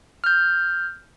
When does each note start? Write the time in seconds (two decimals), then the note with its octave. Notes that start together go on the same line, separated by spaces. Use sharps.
0.24 F6 G6